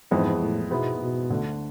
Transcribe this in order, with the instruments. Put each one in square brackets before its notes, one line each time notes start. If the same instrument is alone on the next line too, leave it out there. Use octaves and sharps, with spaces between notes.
[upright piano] F2 E3 G#3 B3 [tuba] G#2
[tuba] A2
[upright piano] G#2 G#3 B3 E4 [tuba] B2
[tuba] B2
[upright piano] D2 D3 A3